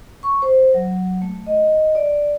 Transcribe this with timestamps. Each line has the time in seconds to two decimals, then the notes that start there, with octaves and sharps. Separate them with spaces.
0.23 C#6
0.42 C5
0.74 F#3
1.22 A3
1.46 D#5
1.95 D5